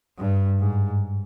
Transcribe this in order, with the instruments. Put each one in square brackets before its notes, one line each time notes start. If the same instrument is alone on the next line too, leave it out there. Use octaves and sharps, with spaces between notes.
[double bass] G2
G#2